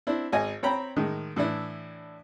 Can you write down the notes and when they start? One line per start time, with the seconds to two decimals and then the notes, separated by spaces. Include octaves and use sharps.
0.07 C4 D4 E4
0.32 G#1 D#5 G#5
0.63 C4 C#5 G5 A#5 B5
0.96 A2 D#3 G#3
1.36 A2 E3 D4 E4